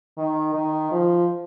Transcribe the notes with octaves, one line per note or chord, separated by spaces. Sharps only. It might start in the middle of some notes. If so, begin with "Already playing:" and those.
D#3
D#3
F3